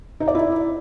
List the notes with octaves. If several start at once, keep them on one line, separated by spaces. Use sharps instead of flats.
D#4
D5
E4